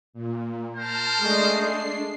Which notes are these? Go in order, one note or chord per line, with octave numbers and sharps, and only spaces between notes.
A#2
A#4 C5 A5 F6
G#3 A3 D4 D#5 C7